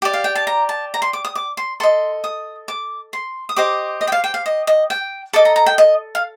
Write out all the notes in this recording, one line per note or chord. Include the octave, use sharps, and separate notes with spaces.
G4 D5
F5
G5
A5
A#5
A5
A#5
C6
D6
D#6
D6
C6
A4 D#5 C6
D#6
D6
C6
D#6
G4 C5 D#5 D6
D#5
G5
F5
G5
F5
D#5
D#5
G5
A4 D#5 D6
A#5
A#5
G5
D#5
F5